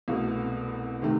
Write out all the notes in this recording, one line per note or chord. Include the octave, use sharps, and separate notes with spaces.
C2 B2 A3
C3 D#3 A3